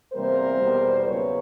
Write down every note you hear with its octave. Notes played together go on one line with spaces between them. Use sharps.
E2 C3 E3 G3 A#3 A#4 C5
E2 B2 G3
E2 C#3 F#3 A#3 B4 C#5